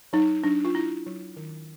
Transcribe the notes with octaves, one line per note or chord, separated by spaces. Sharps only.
F#3 D#4
F#3 D4
F4
D4 E4
F#3
D#3